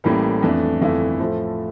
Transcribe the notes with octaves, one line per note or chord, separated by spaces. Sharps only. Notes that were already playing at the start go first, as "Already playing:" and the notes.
A1 A2 E3 G3 A#3
F2 E3 A3 D4
G1 F2 E3 A3 E4
A2 F3 A3 C4